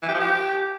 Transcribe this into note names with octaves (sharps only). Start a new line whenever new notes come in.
E3
G4
F3
G4